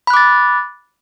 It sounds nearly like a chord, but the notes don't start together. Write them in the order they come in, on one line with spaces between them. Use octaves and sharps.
B5 F#6 D6 A6